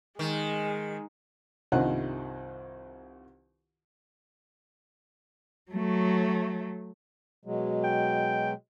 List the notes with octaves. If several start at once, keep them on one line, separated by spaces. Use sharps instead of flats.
D#3 G#3
C2 G2 D#3 F4 C5 F#5
F#3 A3
B2 F#3 G#3
G5